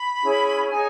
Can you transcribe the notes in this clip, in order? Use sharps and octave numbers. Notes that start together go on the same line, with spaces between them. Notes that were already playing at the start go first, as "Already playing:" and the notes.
Already playing: B5
C#4 E4 G#4
D#4 G#4 C#5 G#5